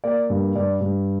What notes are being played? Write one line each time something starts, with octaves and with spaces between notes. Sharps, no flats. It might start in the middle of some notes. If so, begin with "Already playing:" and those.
A#3 D5
G2
G2 D5
G2